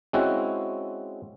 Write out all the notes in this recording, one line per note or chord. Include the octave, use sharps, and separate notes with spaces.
G#3 C4 C#4 E4 F#4